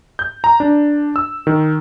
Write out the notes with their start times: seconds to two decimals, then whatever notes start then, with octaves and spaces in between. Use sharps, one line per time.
0.19 G6
0.44 A#5
0.60 D4
1.16 E6
1.47 D#3